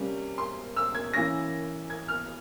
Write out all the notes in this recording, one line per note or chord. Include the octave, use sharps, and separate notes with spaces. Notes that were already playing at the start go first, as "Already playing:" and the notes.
Already playing: C3 G3 A#3 C#4
C6
E6
G#6
E3 A#3 C#4 A#6
G#6
F6